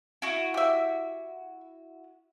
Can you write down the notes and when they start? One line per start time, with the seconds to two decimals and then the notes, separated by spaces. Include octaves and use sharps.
0.22 E4 F#4
0.54 G4 E5